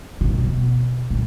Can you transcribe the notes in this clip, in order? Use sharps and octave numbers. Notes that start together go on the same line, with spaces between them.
B2
A#2
B2
A#2